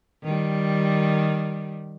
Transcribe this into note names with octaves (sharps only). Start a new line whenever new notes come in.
D#3 G3